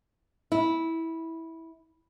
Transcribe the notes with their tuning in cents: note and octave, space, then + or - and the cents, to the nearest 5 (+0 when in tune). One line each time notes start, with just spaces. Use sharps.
E4 -15